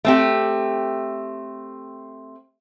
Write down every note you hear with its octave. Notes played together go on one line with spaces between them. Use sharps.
A3 C4 G4